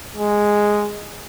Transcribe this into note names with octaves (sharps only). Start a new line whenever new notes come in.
G#3